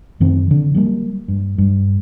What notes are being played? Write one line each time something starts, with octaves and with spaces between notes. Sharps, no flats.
F#2 D#3 C4
D3
F#3 G3 A#3
G2
G2